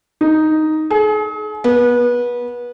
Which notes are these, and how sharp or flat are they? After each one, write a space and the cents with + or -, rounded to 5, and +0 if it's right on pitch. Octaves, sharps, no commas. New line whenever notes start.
D#4 +0
G#4 +40
B3 -25